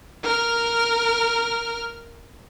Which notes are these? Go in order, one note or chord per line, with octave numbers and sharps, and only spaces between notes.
A#4 F6